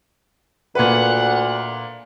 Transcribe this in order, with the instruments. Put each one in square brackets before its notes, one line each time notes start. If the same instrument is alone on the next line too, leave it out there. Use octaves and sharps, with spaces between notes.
[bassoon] D2 [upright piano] A#2 B4 [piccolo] F#5